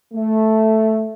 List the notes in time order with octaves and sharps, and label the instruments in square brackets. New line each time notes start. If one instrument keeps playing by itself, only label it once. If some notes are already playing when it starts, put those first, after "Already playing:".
[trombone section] A3